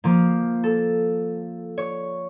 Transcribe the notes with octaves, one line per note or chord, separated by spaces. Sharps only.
F3 A#3
A4
C#5